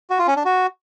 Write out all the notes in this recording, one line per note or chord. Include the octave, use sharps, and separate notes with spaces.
F#4
F4
C#4
D4
F#4